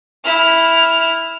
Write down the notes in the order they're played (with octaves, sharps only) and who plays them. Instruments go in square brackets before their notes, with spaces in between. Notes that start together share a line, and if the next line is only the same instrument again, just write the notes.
[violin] E4 F6